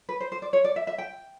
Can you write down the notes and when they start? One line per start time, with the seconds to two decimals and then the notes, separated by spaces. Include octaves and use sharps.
0.09 B4
0.20 C5
0.32 C5
0.42 D5
0.53 C#5
0.64 D5
0.76 E5
0.87 E5
0.98 G5